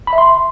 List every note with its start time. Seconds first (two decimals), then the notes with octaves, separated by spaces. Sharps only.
0.07 B5
0.13 E5
0.18 C6